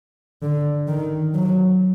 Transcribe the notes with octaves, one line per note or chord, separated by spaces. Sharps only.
D3
D#3
F#3